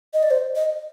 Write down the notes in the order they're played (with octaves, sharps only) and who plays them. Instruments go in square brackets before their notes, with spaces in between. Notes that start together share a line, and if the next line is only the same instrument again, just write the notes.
[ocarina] D#5
D5
C5
D#5